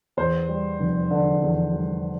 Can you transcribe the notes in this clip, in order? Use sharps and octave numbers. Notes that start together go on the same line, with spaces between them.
E2 C5
G3
F1
D3
E2
G3